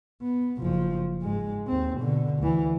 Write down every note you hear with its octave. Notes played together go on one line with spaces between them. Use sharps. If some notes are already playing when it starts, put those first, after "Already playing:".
B3
F#1 F3
G#2 G#3
D#2 C4
B2 D3
D2 E3